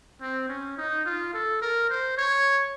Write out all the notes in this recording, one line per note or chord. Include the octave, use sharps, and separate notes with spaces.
C4
C#4
D#4
F4
A4
A#4
C5
C#5